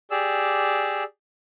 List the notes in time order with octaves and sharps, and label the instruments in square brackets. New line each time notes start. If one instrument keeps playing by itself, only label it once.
[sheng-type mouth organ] G4 G#4 D5 E6